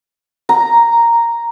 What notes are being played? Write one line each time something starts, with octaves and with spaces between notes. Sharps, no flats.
A#5